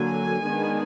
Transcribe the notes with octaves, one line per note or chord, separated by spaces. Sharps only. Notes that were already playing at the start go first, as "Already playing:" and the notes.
Already playing: D3 F#3 A#3 G#5
D#3 G#3 B3 D4